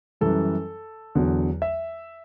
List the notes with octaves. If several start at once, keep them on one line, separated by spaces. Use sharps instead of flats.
F#2 E3 G3 A4
E2 D3 F#3
E5